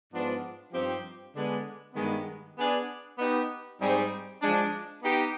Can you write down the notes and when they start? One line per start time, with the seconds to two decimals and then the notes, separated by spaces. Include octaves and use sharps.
0.11 G#2 F3 B3 D4 F4
0.72 G2 F3 C4 D#4 G4
1.33 D3 G#3 B3 D4 G#4
1.94 G2 D#3 G#3 B3
2.56 B3 D4 G#4 D5
3.17 B3 D#4 G4
3.79 G#2 G3 C4 D#4 G#4
4.40 F3 G#3 D4
5.01 B3 D#4 G4